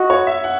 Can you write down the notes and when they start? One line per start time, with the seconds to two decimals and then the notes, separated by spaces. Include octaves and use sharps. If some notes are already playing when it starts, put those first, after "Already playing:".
Already playing: F#4 D#5
0.10 C#5
0.27 E5
0.44 F#5